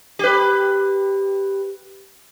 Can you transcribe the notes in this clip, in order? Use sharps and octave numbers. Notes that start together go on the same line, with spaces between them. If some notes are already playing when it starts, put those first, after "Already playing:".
G4 B4